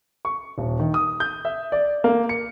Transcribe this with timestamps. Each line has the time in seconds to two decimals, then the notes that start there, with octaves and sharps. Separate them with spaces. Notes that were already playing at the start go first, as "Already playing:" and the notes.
0.25 C#6
0.58 D#1
0.79 D#3
0.94 D#6
1.20 G6
1.45 E5
1.72 D5
2.04 A#3
2.29 C#7